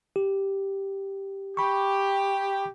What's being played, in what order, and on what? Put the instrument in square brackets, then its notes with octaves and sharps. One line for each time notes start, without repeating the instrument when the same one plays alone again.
[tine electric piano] G4
[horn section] G4 [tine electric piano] B5 C#6